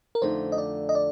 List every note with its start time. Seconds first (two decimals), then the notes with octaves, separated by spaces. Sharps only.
0.15 A#4
0.22 F2 D3 A3 D#4 C5
0.52 D#5
0.58 D5
0.89 D#5
0.95 D5